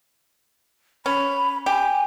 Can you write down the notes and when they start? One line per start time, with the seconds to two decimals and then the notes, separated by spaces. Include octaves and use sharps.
1.06 C#4 B5
1.66 G4 G#5